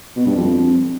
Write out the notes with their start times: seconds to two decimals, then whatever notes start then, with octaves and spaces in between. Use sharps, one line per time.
0.16 B2
0.26 G2
0.36 F2